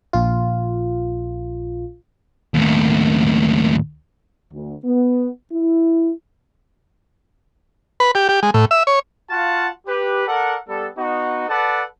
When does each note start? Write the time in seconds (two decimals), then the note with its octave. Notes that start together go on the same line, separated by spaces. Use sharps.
0.13 A#1 F4
2.54 D#2 A2
4.52 D2
4.84 B3
5.52 E4
8.00 B4
8.15 G4
8.29 G4
8.43 G#3
8.54 A2
8.71 E5
8.87 C#5
9.29 F4 F#4 F5 F#5 A5
9.87 G4 B4
10.27 A4 A#4 D5 F#5
10.69 G3 B3 A4
10.97 B3 D#4 F#4
11.49 A4 B4 D5 F#5 A5